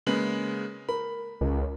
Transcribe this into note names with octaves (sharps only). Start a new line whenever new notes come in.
C#3 G#3 A#3 B4 F#7
A#4 B5
C#2 A#4